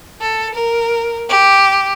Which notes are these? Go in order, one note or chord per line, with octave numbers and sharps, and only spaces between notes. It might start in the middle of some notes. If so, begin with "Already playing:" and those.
A4
A#4
G4